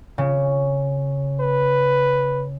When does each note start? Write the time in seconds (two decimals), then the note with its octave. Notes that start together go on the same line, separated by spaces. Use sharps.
0.18 C#3
1.40 B4